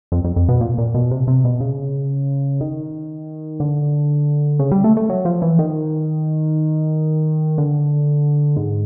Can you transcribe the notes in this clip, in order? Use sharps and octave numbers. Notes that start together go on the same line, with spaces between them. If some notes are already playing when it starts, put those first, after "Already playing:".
F2
F2
F2
B2
A#2
A#2
B2
C3
C3
B2
C#3
D#3
D3
C#3
G3
A3
A3
F#3
F3
E3
D#3
D3
G#2